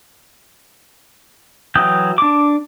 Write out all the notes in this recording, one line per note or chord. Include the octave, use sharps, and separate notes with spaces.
E3 F#3 G5 D#6 G6
D4 D6